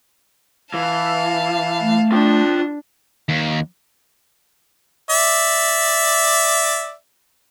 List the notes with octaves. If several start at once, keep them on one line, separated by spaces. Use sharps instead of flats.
E3 F5 A5
A3
D4 F4 G5
D#2
D5 E5